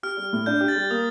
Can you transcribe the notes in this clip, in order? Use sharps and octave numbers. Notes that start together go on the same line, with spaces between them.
G4 F6
G3
A2
D4 G6
G4
A6
G3
A#3 D#6